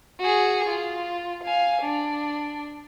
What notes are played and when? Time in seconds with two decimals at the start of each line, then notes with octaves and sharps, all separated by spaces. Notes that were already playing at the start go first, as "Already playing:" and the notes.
0.20 F#4 G#4
0.69 F4
1.44 F5 G#5
1.82 D4